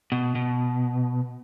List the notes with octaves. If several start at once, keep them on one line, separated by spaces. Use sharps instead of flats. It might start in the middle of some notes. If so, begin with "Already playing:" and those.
B2
B2